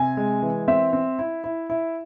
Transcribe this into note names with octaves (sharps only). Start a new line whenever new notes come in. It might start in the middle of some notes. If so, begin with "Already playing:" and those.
Already playing: C3 G#5
G#3
E3
C4 E5
C4
E4
E4
E4